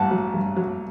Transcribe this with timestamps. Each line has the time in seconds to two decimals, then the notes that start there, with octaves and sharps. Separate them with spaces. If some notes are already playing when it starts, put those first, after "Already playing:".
Already playing: A1 G2 F#5 A5
0.11 F#3
0.34 G2
0.56 F#3